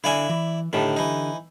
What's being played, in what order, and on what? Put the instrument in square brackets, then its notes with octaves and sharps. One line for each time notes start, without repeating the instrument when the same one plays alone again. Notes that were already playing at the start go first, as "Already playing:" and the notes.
[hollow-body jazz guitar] D3 F5 G#5 [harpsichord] E4 D5 E5
[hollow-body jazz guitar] E3
[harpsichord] A2 D#3 [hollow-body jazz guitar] D3 G4 A5
[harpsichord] E3 D#4